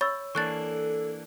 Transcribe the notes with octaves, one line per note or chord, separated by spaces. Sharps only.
C#5 B5 C#6 E6 A6
E3 A#3 D4 A4 C#6 F#6 A6